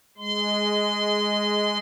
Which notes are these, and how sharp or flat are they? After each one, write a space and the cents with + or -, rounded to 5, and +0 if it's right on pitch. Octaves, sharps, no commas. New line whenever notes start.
G#3 +0 C6 -30